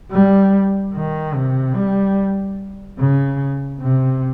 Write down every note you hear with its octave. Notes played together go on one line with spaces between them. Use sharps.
G3
D#3
C3
G3
C#3
C3